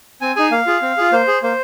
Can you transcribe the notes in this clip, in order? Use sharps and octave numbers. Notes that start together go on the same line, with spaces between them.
C4 G#5
D#4 G#4 G#5
A#3 F5
F4 G#4
C4
F4 G#4
A#3 C5
G#4
A#3 C5